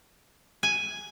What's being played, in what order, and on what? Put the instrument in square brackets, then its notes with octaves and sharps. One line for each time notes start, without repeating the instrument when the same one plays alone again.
[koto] G#5